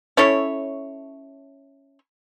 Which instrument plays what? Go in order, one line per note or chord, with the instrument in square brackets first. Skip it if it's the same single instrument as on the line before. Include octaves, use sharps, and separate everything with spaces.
[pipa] C#4 E4 A4 C#5